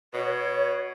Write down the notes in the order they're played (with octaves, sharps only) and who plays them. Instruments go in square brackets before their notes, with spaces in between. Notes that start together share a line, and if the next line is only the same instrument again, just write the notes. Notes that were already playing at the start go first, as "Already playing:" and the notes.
[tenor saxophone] B2 [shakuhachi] C#5